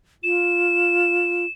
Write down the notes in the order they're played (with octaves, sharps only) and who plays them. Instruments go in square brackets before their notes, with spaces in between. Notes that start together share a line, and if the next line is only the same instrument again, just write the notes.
[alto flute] F4 [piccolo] E7